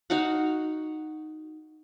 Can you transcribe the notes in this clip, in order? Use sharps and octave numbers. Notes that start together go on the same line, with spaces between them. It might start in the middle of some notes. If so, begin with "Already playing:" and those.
D#4 F#4 F5 F#5